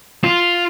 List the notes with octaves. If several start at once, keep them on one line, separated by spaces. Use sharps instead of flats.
F4